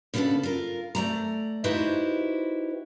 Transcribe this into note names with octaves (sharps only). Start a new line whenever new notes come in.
C#3 B3 D4 G4 A4 B4
F4 A#4
A3 D5 A#5
D#4 E4 F#4 G4 B4 C5